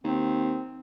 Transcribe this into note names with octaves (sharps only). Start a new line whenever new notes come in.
D#2 C4